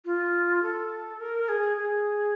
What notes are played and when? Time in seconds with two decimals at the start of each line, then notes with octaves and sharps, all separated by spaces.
0.05 F4
0.63 A4
1.20 A#4
1.49 G#4
1.77 G#4